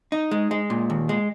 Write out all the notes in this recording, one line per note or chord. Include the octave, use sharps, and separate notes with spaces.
D#4
G#3
G#3
A#2
D#2
G#3